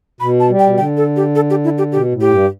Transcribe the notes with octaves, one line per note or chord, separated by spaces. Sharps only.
B2 B5
A5
G3
G5
B2
D3 G5
A4
G4
A4
G4
E4
G4
B2 G4
A2
G4
G2